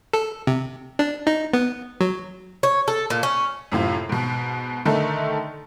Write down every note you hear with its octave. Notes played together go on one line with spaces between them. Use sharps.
A4
C3
D4
D#4
B3
F#3
C#5
A4
A#2
C#4
F#2 A2 C3 F4
G#2 B2
D3 D#3 A3 D#4 A4